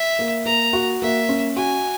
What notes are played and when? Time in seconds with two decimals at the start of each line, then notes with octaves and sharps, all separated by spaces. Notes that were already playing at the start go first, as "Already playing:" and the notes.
Already playing: E5
0.19 A#3
0.46 A#3 A#5
0.73 F#4
1.01 A#3 E5
1.29 C#4
1.56 F#4 G#5